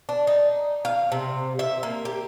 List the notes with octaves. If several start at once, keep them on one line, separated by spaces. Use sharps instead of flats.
D4
D#4
F5
C3
E5
A#3
G4